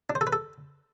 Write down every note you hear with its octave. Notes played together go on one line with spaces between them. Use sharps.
D4
C5
A4
B4
A4